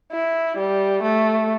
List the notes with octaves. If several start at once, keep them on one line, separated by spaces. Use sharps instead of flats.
E4
G3
A3